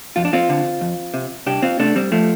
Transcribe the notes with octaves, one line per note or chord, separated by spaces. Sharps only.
F2 F4
D4
C4 F4
D3
F2
C3
C2 D4 G4
C4 F4
C3 A3 D4
G3 C4
F3 A3